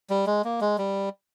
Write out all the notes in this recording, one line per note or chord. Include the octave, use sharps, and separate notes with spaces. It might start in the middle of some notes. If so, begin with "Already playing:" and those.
G3
G#3
A#3
G#3
G3